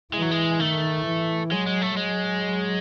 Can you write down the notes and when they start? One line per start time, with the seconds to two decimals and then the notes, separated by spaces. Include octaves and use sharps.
0.13 E3 G#3
0.22 F#3
0.31 G#3
0.59 D#3 A3
1.06 E3
1.51 F#3 G#3
1.67 G#3
1.82 A3
1.97 F#3 G#3